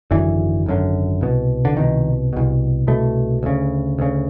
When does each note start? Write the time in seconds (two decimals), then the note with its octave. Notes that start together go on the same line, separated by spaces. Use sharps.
0.11 G#1 F#2 D3 E3
0.66 G#1 F#2 D3
1.21 C2 B2
1.65 D3
1.77 C2 B2 D#3
2.33 C2 B2
2.87 C2 B2 A3
3.43 D2 C#3
3.99 D2 C#3